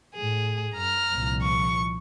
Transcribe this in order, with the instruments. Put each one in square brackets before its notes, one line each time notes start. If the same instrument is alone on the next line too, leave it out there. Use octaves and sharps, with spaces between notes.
[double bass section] A2 [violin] G#4
[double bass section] F#2 [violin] A#5 F6
[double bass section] C2 A#2 F3
[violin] C#6